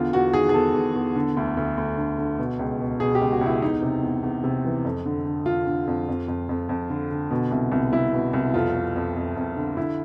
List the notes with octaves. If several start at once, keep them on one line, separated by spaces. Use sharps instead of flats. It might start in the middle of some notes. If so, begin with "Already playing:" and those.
Already playing: E2 D3 F4
E2 F#4
D#3 G#4
G#4
E2 A4
E2
E2
D3
D2
D2
D2
D3
D3
B2
C#2
B2
B2 G#4
G4
C#2
F#4
C#2
E4
E2 D#4
C3
E2
E2
C3
E3
F2
D3
D3
D3 F4
D3
F2
F2
F2
F2
F2
D3
D3
B2
C2
C2
C2 E4
B2
C2
F2 F4
F2
F2
F2
F2
D3
D3 E4